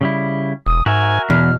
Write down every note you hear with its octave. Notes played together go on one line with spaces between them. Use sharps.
C#3 G3 E4
E1 D#6
G#2 F#4 A#4 E5 G#5
E2 B2 F6